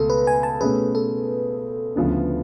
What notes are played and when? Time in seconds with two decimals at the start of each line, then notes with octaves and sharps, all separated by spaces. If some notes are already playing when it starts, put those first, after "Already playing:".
Already playing: C#2 B2 A3 A4
0.10 B4
0.27 G#5
0.43 A5
0.61 B2 A3 C#4 G#4 B4
0.95 A4
1.96 D2 C#3 F3 B3 D4